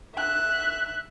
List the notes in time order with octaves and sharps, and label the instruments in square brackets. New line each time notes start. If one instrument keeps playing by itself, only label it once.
[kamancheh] E5 F#6